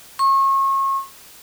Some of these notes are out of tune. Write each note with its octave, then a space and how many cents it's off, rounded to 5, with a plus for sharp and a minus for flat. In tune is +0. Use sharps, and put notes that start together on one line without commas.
C#6 -35